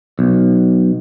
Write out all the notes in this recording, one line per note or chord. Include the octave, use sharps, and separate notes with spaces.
B1